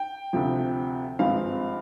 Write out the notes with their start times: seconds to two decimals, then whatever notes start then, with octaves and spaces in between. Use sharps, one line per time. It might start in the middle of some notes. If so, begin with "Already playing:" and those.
Already playing: G5
0.33 D2 C3 F3
1.19 G#1 G2 F3 G#3 C4 F5